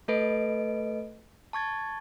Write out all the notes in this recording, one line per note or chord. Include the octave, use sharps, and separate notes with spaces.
A3 A4 B4 D#5 D7
A5 C#6 G#6 A6